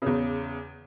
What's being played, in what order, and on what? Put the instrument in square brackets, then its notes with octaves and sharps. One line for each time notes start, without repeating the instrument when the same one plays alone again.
[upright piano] E2 C#3